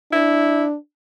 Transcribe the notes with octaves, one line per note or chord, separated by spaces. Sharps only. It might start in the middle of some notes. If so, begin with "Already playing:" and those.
D4 E4